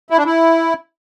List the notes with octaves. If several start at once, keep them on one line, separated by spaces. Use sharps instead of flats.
E4
D4
E4